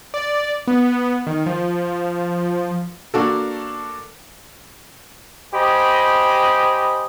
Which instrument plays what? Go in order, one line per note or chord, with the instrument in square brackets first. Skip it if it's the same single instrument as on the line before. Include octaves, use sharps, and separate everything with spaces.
[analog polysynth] D5
B3
D#3
F3
[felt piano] A#3 D4 F#4 A4
[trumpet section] G4 C5 D#5 G#5 B5